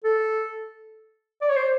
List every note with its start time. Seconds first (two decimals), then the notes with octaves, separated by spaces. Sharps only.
0.04 A4
1.41 D5
1.49 C#5
1.56 C5